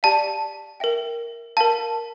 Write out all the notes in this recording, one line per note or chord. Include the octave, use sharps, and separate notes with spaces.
G4 D5 F5 A5
A#4 E5 G5
A#4 F5 A5